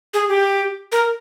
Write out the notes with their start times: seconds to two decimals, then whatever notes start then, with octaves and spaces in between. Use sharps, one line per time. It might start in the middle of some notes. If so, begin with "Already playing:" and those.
0.14 G#4
0.29 G4
0.92 A#4